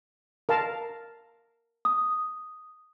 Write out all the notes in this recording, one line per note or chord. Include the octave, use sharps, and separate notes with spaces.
A#4 F5 A5
D#6